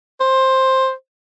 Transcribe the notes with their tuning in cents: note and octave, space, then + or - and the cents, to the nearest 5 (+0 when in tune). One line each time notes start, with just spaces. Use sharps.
C5 +10